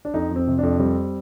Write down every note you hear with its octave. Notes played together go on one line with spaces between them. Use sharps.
D4
F2 D#4
F2 C4
C3
F2 D4
G3 C4